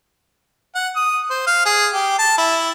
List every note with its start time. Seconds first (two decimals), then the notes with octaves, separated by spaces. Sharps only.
0.75 F#5
0.96 D#6
1.30 C5
1.47 F5
1.65 G#4
1.94 G4
2.19 A5
2.38 E4